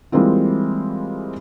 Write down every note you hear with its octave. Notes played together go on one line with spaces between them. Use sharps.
E3 G3 G#3 A#3 C4 F4